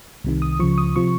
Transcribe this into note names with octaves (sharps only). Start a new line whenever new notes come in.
C2 C3 D#3
D#6
C#2 C#3 F3 C#6
D#6
C3 F3 C#6